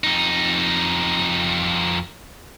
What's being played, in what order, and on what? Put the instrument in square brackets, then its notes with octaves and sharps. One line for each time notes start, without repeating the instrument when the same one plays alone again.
[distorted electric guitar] F2 D#4